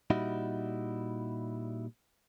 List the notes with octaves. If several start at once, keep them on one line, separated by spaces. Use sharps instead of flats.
A#2 G3 D#4 E4 F#4